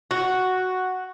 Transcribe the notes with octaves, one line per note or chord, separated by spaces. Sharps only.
F#4